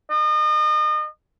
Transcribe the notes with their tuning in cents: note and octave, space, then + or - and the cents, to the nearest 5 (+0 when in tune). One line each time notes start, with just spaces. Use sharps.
D#5 -35